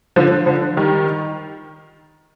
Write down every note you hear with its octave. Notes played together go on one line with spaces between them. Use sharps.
D3 F3
D3 F3
D#3 G3